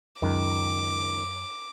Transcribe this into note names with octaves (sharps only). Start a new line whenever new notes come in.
C#2 F#2 D#3 D6